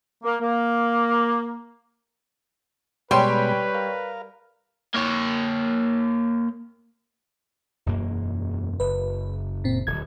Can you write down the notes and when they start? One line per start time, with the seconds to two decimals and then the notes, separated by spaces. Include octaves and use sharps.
0.24 A#3
0.41 A#3
3.11 B2 G3 G#3 B4 C#5 G5 B5 C6
3.75 A#4 F5
4.94 A#3 C#5
7.86 E1 F#2 A#3
8.80 F#1 B4
9.64 A#2 C4
9.87 D1 G#6